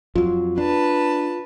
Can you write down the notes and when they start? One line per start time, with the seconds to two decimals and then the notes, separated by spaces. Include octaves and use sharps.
0.16 F2 F#3 F4
0.58 D4 B4 A5